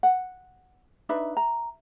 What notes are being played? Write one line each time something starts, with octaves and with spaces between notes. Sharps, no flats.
F#5
D4 D#4 B4 E5
A#5